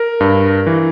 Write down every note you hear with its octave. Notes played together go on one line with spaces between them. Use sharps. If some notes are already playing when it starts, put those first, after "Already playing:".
Already playing: A#4
G2
E3